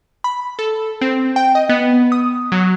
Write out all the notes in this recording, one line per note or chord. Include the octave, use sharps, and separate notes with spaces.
B5
A4
C4
G5
D#5
B3
D#6
F#3